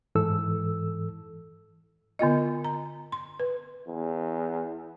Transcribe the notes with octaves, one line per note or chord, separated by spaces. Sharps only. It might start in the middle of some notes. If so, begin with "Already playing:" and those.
G#2 E3 A4 E6
D3 B3 F4 D#5
A#5
C6
B4
E2